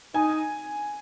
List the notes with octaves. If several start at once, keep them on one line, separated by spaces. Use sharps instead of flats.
D#4 G#5